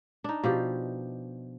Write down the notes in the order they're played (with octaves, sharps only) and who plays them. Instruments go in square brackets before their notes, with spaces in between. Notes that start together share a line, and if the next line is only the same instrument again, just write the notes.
[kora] D4 D#4
B2 F3 G4